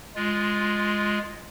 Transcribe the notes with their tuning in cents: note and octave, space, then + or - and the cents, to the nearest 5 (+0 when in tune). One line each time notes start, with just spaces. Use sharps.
G#3 +0 F4 +0